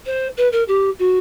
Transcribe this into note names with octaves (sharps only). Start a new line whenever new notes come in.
C5
B4
A#4
G4
F#4